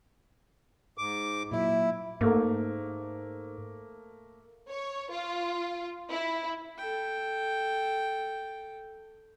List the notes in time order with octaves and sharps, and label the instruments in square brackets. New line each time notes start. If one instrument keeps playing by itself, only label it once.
[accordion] G#2 D6
[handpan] A#2 F#3 E5 [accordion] E4
[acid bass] G#2 [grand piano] A3 A#3
[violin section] C#5
F4
E4
[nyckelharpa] A4 G5